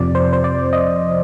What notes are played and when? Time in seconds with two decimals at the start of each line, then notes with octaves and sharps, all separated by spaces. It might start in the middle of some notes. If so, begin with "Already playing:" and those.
Already playing: F2 C3 F3 D5
0.15 C5
0.33 C5
0.44 D5
0.73 D#5